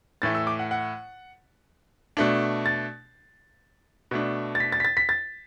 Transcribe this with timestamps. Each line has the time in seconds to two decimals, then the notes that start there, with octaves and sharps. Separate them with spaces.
0.22 A2 E3 A3 A6
0.35 E6
0.47 D6
0.59 F#5
0.71 F#5
2.17 B2 A3 D4
2.66 A6
4.11 B2 A3 D4
4.55 A6
4.60 B6
4.72 A6
4.80 B6
4.85 A6
4.97 B6
5.09 A6